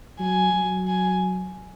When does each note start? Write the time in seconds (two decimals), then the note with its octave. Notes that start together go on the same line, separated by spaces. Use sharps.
0.19 F#3 G#5
0.54 F#3
0.88 G#5